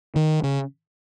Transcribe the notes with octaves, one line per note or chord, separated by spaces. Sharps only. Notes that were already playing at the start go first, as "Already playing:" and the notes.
D#3
C#3